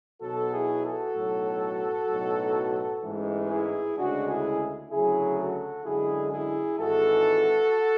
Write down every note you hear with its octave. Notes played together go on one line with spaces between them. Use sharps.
B1 B2 F#3 F#4 A4
E4 G#4
F#4 A4
B1 A2 F#3
B1 A2 F#3
A1 G#2 E3 G#3
E4 G#4
D2 C#3 G#3 D4 F#4
E4 G#4
D2 C#3 F#3 E4 G#4
F#4 A4
F#2 D3 G#3 E4 G#4
E4 G#4
G#1 G#2 E3 G#3 F#4 A4